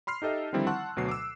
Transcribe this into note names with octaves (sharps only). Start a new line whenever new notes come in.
B5 C6 F6 C7
D#4 G4 A4 D#5 E5
D3 D#3 F3 G3 C4 E4
F#5 A5 C6 C#6 E6 F#6
D2 B2 F#3 C7
D6 E6